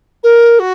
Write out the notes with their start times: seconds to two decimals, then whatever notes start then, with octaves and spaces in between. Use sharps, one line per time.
0.23 A#4
0.59 F#4